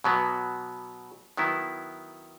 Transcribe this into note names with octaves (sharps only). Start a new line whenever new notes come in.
B2 F#3 B3
D#3 F#3 B3 E4